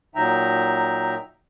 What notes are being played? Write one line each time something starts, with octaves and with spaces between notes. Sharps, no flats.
A#2 F#3 D#4 E5 G5 A#5